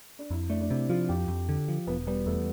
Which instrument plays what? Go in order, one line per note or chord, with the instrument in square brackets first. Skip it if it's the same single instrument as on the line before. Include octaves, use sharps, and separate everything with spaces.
[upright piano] D4
[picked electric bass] F2 [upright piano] E4
[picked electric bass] A3 [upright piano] D4
[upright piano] D4
[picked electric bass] C3 [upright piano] E4
[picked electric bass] F3 [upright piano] F4
[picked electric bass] F2 [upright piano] G4
[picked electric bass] F2
D3
F3
[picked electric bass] E1 [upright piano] B3
[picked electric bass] G3 [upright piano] B3
[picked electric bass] E2 [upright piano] A3